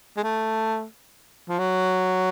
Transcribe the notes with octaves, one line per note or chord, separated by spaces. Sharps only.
G#3
A3
F3
F#3